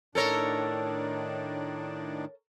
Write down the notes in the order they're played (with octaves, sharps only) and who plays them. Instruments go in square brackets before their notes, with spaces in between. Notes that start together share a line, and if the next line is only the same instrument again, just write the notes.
[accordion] A2 D#3 D4 [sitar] A4 A#4 C#5